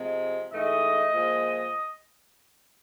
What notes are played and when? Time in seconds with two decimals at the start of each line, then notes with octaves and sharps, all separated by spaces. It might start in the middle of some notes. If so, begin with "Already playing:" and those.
Already playing: C3 F3 G#3
0.53 G#2 E3 A3 D#5
1.14 A#2 F3 G#3